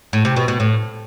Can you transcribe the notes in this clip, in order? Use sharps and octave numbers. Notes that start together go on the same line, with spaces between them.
A2
C3
B2
B2
A2